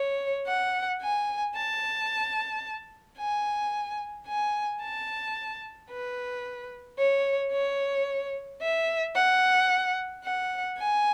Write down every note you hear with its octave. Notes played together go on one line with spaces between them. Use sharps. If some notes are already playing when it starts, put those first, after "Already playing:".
Already playing: C#5
F#5
G#5
A5
G#5
G#5
A5
B4
C#5
C#5
E5
F#5
F#5
G#5